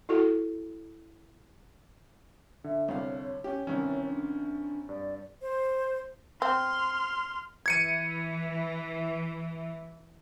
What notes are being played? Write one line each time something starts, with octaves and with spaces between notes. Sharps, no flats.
E4 F#4 A4
D3 E5
C2 C#5 F5
C#4 G4
C2 D#3 E3 C#4
D4
G2 D5
C5
C4 C6 F6
E3 G#6 C#7 D#7